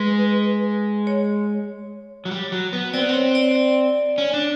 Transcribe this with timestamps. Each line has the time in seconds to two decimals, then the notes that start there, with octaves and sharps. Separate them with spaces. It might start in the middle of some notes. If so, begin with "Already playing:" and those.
Already playing: G#3 B4
1.07 C#5
2.25 F#3
2.31 G3
2.52 F#3
2.73 B3
2.93 C4 D5
3.01 B3
3.09 C4 C#5
3.35 D5
3.55 D5
4.18 C#4
4.34 D4